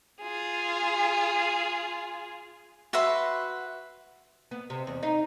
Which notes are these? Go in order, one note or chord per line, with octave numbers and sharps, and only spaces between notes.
F4 G#4
F#4 B4 E5 C6
B3
C3
E2
D#4